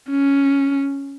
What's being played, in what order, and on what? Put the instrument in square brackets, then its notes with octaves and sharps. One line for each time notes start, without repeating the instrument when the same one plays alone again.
[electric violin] C#4